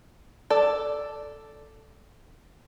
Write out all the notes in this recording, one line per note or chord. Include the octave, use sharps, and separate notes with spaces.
A4 D5